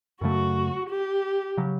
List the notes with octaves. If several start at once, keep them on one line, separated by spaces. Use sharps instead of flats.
F#2 C#3 F#3 A3 F#4
G4
C#3 F#3